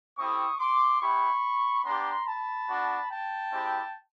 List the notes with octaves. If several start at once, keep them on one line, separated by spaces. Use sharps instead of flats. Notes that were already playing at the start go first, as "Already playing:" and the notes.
A3 C4 E4 G4 C#6 D#6
C6 D6
B3 E4 G4 B5 C#6
B3 D4 G4 A#5 C6
A5 B5
B3 D4 F#4
G5 A5
G#3 C4 E4 G4